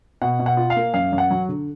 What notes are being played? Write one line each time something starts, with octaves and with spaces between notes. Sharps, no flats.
B2 F#5
B2
F#5
F4
F5
A#3
F#2 F5
F#2
F#5
F#3
D3